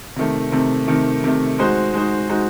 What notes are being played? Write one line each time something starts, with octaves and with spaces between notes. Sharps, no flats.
C3 D#3 A3
C3 D#3 A3
C3 D#3 A3
C3 D#3 A3
G#3 D#4 F#4 C5
G#3 D#4 F#4 C5
G#3 D#4 F#4 C5